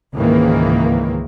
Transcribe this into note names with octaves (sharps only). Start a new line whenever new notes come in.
C#2 G#2 D#3 E3 A#3